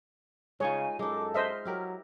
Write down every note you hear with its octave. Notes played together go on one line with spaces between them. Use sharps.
C#3 G#3 D#4 F4 C#5 G#5
F#2 G#3 D#4 A4 D6
C5 D#5 E5 F6
F#3 E4 G4 A#4